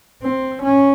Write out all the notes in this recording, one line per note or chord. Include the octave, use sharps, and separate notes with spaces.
C4
C#4